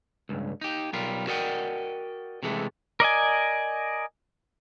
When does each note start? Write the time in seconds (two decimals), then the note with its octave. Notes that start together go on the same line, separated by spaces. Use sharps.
0.29 C#2 G2
0.61 D#4 G4
0.93 B1 G3 F4 A#4
1.28 F#4 A#4 D5 D#5 F#5 G5
2.43 C3 E3 G#3 A3
3.00 A#4 D5 D#5 G#5